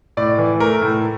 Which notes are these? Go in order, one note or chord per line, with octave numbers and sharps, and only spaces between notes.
A2 D5
E3
A3 A#4
A2